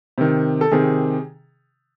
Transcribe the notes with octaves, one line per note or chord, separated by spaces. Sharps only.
C3 D#3
A4
C3 D#3 G#4